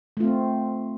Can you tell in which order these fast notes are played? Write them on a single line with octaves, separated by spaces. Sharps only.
A3 F4 C4